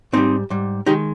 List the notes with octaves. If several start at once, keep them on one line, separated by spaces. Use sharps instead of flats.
G#2 G3 C4 D#4
G#2 G3
D#3 G#3 D#4 G4